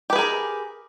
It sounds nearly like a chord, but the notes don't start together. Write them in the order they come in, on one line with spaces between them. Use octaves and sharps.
G4 B4 G#4 A#4